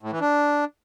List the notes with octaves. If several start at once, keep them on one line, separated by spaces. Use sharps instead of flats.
A2
E3
D4